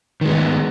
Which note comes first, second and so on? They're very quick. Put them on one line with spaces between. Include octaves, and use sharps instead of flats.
D#3 G#3 B3